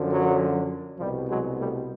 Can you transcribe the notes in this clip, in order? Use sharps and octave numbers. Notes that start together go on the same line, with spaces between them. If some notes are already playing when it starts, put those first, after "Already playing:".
Already playing: F#2 D3 F3
F#3
C2 B2 F3 G3
F#3 G#3
G3 A3